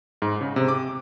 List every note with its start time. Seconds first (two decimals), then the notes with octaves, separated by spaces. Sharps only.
0.22 G#2
0.41 C#3
0.56 C3
0.68 D6